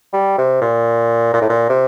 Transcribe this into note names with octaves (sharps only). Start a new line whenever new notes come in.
G3
C3
A#2
A#2
A2
A#2
C3